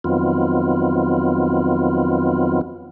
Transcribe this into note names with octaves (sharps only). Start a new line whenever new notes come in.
F2 D#3 F#3 B3 C4 F4